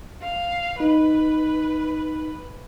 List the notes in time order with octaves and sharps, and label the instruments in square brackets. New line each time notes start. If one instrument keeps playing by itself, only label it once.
[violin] F5
[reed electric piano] D#4 [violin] B4